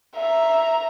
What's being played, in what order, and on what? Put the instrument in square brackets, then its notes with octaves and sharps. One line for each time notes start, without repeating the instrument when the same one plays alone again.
[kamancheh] E5 A#5